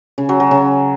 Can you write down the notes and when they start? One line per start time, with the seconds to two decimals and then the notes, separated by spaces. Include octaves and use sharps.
0.18 C#3
0.29 F#3
0.40 F#3
0.51 C#3